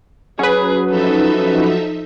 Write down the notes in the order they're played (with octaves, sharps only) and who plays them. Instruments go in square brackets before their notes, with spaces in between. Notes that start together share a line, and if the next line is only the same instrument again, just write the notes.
[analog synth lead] F#3 [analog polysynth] C#4 B4 [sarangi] G#4
[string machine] F3 D#4 E5 [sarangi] A4